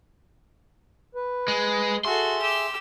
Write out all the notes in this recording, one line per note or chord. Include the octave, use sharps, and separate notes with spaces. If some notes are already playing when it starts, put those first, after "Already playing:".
B4
G#3
F#4 G#4 A4 E5 C6
G4 E6